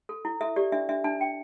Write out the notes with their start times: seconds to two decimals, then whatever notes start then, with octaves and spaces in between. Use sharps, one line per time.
0.09 A4
0.25 E4
0.41 A4 E5
0.56 G4 D5
0.72 D4 E5
0.89 D4 E5
1.04 D4 A5
1.20 D4 G5